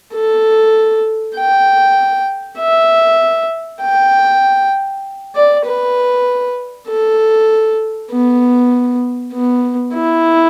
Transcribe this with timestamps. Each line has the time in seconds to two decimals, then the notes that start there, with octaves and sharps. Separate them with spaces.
0.14 A4
1.37 G5
2.59 E5
3.82 G5
5.35 D5
5.65 B4
6.88 A4
8.11 B3
9.33 B3
9.94 E4